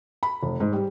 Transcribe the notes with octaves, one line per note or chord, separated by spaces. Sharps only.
B5
F1
G#2
G3